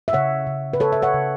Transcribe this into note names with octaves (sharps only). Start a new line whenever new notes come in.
E5
C#3 C#5 F#5
C#3
B4
C#3 A4 C#5
E5
C#5 F#5
C#3